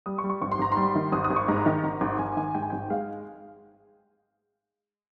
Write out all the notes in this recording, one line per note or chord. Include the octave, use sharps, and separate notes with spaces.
G3 D#6
C#6
G3
C#6
G#1 C#6
C6
G#1 A#5
G3 C6
D#3
G#1 D#6
D#6
G#1
C#6
G#2 A#5
D#3
G#1
G#1
G#1 G#5
D#3 G#5
G#2 G5
G#5
G#1 G5
G#3 F5